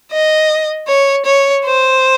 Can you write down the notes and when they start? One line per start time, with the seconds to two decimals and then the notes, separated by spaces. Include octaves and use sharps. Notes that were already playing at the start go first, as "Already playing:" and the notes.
0.12 D#5
0.88 C#5
1.26 C#5
1.65 C5